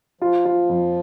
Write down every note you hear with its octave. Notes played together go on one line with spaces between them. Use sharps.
F3 F4
F4
F2